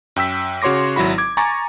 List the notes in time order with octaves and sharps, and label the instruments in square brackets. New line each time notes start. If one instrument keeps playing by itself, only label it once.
[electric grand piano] F#2 G5 E6 B6
C#3 F#4 C#5 C6 D6 A#6
G#1 F#3 E4 F#4 B5
D6 G#6
G#5 A#5 C#6 D6 A6